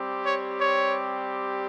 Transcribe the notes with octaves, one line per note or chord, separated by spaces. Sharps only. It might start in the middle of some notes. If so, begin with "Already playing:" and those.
Already playing: G3 C4 G4
C#5
C#5